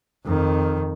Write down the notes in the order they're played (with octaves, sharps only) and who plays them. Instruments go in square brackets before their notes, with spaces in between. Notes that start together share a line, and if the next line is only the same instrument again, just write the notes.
[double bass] F2 D#3